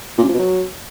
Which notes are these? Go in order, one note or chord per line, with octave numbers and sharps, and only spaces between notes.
A#2
F#2
F3
B2
F#3